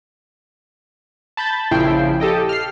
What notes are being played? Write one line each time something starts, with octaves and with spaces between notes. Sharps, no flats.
A5 B5 G6 A6
A#1 C#3 F3 E4 G5 C7
G4 A4 D#5 G5
F6 C7